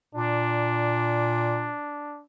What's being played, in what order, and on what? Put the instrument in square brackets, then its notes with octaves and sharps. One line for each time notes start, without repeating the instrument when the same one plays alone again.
[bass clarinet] A#2 [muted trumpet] D4